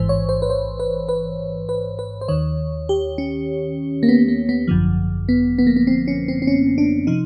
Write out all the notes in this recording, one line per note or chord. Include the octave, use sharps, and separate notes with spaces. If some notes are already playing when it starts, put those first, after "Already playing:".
Already playing: A1 G#2 E3 C5
C#5
C5
B4
C5
B4
B4
B4
B4
C5
D#2 D#3 C#5
G4
C#4
A#3
B3
A#3
B3
G#1 F#2 D3 F3
B3
B3
A#3
B3
C4
C#4
C4
C4
C#4
D4
C3 F3 D#4